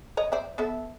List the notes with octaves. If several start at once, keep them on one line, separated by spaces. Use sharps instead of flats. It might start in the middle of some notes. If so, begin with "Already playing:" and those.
C#5 D#5
C5 D5 E5
B3 A4 E5